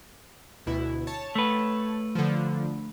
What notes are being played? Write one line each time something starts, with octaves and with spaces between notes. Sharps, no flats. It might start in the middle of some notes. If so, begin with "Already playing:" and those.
D2 B2 E4
C#5 A5
A3 B4
D3 F3